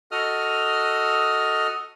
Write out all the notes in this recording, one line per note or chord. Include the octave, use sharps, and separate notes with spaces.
F#4 A4 D#5 D#6 F6